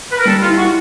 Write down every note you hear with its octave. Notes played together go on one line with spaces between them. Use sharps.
B4
A#4
G3 A4
F4
E4
F#4